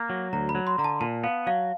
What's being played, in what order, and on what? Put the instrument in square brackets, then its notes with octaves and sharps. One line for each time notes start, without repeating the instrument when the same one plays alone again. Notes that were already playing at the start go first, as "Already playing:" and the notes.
Already playing: [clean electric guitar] A#3 [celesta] A#5
[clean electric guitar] F#3
[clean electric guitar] D2 [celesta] A#5
[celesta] B5
[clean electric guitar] F#3
[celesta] C6
[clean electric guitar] D3 [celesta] A#5
[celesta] A5
[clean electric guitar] A#2 [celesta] A5
[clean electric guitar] B3 [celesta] F5
[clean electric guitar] F#3 [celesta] F5